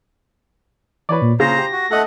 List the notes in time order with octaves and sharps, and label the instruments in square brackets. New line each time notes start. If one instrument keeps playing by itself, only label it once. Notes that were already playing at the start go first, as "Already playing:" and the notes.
[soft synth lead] E3 [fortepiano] B4 C#5 D5
[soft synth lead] A#2
[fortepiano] A#2 C#3 [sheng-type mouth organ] C5 A#5 [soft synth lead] A#6
[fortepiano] G4
[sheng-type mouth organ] F#4
[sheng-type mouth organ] A3 F#5 [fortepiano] A4 D#5